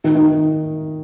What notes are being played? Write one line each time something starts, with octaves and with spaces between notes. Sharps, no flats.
D#3
D#3